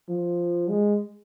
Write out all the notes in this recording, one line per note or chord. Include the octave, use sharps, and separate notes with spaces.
F3
G#3